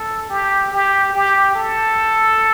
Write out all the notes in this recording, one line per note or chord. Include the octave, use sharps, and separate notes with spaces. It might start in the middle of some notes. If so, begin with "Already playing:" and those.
Already playing: A4
G4
G4
G4
A4